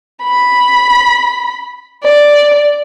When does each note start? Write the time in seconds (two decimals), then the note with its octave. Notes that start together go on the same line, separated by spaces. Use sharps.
0.24 B5
2.03 D5